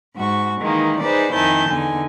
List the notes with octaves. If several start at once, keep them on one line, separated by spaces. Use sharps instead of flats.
G#2 F#4 C#6
D#3 E3 G#3 A#3 D#4
D#4 G#4 B4 C5 D5
F2 D#3 E4 G#5 A5 G6
E2 D3 D#4 G#5